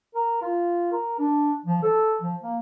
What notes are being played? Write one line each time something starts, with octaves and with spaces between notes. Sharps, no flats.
A#4
F4
A#4
D4
F3
A4
F3
A#3